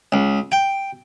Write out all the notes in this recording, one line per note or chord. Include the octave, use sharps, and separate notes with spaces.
C#2
G5